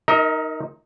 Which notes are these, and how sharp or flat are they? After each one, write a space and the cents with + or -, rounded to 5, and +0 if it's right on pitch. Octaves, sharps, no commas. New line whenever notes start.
D#4 +0 A#4 +0 D#5 +45